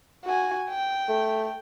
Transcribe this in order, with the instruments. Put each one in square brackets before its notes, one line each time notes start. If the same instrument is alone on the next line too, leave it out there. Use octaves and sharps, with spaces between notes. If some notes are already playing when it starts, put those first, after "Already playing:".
[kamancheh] F#4 G#5
G5
[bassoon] A3